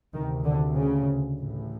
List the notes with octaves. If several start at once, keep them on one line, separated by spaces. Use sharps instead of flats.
D2 C3 D#3
D3
C#3
A1 A2